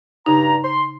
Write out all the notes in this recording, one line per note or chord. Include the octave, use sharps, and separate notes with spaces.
G2 C#3 D#4 A#5
C6